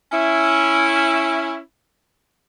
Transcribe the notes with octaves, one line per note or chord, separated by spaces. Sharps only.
C#4 E4